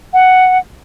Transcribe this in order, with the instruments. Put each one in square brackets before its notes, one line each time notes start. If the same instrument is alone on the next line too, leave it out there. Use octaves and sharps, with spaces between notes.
[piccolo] F#5